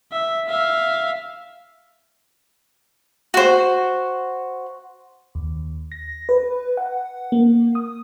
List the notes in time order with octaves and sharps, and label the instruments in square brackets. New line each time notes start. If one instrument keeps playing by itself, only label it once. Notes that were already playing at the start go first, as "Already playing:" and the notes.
[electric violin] E5
E5 F5
[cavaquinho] F#4 C5
[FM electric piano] D#2
A#6
B4
F#5
A#3
D#6